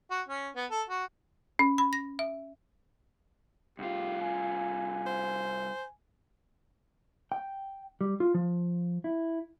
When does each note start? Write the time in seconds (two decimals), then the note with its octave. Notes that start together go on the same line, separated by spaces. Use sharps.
0.10 F#4
0.28 C#4
0.56 B3
0.71 A4
0.89 F#4
1.59 C#4
1.78 B5
1.93 A#6
2.19 E5
3.79 C2 F4 G4
4.22 G#5
5.06 C5
7.32 G5
8.01 G3
8.20 F4
8.34 F3
9.04 E4